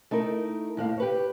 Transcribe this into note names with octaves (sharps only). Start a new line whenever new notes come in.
A3 D#4 E4 A#4
D#2 A2 F5
G4 B4 C#5